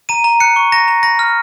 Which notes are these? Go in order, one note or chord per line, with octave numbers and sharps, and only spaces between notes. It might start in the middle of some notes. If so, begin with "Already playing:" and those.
A#5 D#7
A#5
F#6 C#7
C#6
A#5 A#6
A#5
B5 A#6
F6